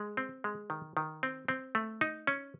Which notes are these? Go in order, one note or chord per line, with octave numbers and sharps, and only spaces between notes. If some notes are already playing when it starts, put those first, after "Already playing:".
Already playing: G#3
C4
G#3
D#3
D#3
C4
C4
A3
D#4
C#4